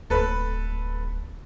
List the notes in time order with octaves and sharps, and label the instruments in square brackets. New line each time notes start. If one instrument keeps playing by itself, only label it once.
[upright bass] D1 [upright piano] A4 B4